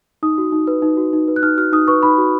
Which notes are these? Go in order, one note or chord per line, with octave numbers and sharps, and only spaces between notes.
D#4 D#6
F#4
D#4
B4
D#4
F#4
D#4
B4
F#6
D#4 F6
F#4 F6
D#4 D#6
B4 C#6
D#4 B5
F#4